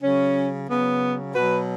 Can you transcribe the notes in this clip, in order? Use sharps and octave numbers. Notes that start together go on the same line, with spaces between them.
C#3 F#3 C#4
C#3 F#3 B3
B2 F#3 F#4 B4